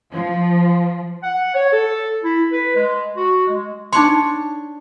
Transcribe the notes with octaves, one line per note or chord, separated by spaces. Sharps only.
F3
F#5
C#5
A4
E4
B4
G#3
F#4
G#3
D4 D#4 C#5 C6